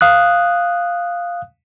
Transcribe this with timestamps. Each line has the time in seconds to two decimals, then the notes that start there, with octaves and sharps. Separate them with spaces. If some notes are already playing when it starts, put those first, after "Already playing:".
0.01 F5 D#6 F#6